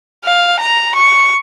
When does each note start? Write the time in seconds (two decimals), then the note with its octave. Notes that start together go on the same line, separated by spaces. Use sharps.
0.24 F5
0.60 A#5
0.95 C#6